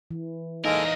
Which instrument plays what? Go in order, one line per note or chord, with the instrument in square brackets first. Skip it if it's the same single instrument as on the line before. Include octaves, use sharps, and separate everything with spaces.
[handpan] E3
[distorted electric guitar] E2 A#4 [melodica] G#3 A#3 A4 [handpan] D#4 F5 [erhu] D#5